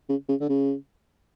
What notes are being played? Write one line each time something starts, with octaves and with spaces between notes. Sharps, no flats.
C#3
C#3
D3
C#3